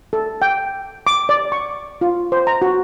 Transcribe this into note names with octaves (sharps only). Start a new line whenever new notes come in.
A4
G5
D6
D5
C#6
F4
C5
A#5
F#4